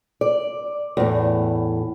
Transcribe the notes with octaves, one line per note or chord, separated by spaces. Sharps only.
D5
E2 A2